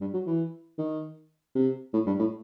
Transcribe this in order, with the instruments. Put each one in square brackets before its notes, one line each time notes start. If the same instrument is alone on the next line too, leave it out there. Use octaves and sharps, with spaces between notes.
[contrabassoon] G2
F#3
E3
D#3
C3
A2
G2
A2